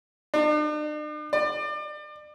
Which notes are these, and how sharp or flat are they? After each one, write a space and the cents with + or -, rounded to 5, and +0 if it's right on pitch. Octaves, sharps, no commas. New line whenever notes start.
D4 +45
D5 +35